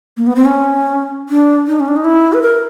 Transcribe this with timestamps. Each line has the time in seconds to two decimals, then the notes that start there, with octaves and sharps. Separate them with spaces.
0.17 A#3
0.27 B3
0.35 C4
0.45 C#4
1.29 D4
1.67 D#4
1.80 C#4
1.88 D4
1.96 D#4
2.05 E4
2.33 B4
2.42 A#4